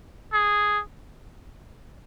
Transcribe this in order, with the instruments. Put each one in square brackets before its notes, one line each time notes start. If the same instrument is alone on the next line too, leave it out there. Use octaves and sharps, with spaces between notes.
[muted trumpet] G#4